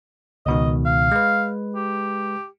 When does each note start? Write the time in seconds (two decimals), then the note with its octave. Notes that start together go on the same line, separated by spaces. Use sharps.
0.46 C#2 B2 D#3 D#5
0.86 F5
1.12 G#3 B4
1.75 G4